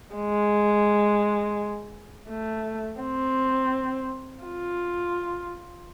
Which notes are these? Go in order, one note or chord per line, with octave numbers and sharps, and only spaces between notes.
G#3
A3
C4
F4